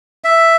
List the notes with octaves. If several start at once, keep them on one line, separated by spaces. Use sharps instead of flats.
E5